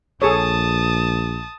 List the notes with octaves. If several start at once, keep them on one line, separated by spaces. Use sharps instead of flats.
A#1 G#4 A4 C#5 A5 D#6